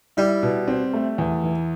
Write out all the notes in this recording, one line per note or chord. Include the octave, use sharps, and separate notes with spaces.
G3 E4
B2
C4
A3
E2
E3